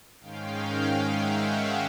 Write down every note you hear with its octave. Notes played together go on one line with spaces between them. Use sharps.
G#2 D#3 G#3 C#4 F5 G5
E5 F#5
E5 F#5